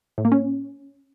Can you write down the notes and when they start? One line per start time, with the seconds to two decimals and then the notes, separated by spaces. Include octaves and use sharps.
0.18 A2
0.25 A#3
0.32 C#4